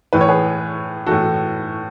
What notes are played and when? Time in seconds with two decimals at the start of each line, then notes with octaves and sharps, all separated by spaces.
0.13 A2 E3 B4
0.21 C#5
0.28 G#4 B4
1.06 A2 E3 F#4 A4